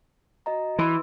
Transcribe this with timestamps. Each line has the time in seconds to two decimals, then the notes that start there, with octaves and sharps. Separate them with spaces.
0.46 F#4 D#5 A#5
0.79 E3 B4 C6 E6